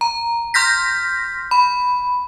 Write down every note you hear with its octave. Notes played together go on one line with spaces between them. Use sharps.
A#5
C6 F6 G6 A#6 B6
B5